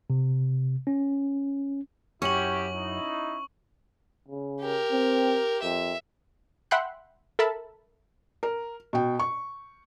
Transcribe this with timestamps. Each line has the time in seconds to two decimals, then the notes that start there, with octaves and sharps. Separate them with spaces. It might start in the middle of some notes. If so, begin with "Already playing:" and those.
0.10 C3
0.87 C#4
2.22 F#2 C#4 E4 F#4 G4 C#6 F#7
2.74 D#4 E4
4.28 C#3
4.61 G4 A#4
4.92 C4
5.62 F2 E5
6.71 E5 F#5 G5 B5 C6 F#6
7.39 A4 A#4 E5 A5 B5
8.43 A#4
8.93 B2 G5
9.19 C#6